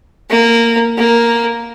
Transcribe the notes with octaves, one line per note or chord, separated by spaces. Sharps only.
A#3
A#3